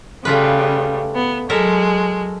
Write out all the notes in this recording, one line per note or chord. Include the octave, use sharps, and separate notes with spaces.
C#3 G3 A3 F4 B4
B3
F#3 G#3 A4 A#4 E5